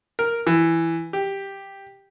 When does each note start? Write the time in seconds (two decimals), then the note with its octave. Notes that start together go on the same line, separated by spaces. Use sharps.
0.19 A#4
0.47 E3
1.13 G4